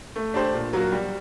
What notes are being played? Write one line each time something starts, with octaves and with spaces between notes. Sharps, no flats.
A3
D4 G4 C5
A#2
F#3 A#3 F#4
G3